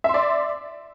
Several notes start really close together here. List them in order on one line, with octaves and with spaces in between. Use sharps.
E5 C6 D5